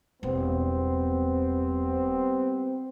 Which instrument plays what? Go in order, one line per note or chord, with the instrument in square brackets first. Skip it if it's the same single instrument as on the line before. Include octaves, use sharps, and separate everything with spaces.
[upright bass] E1 [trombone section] G3 B3 C4